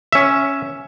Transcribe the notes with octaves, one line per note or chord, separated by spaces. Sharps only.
C#4 E5